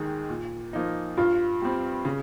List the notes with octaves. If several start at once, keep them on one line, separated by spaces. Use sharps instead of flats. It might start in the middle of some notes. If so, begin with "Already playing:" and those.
Already playing: D#2 D#3 G#3 D#4
A#2
F3 A#3 D#4
G2 F4
G3 C4
C#3